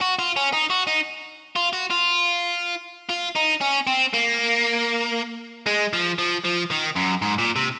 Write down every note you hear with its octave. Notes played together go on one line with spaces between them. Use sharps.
F#4
F4
C#4
D#4
F#4
D#4
F4
F#4
F4
F4
D#4
C#4
C4
A#3
G#3
F3
F3
F3
D#3
F#2
G#2
A#2
C3